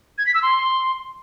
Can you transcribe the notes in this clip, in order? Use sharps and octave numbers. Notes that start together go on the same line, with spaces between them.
G#6
B6
E6
C6